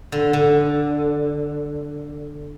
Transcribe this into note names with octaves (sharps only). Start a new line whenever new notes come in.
D3
D3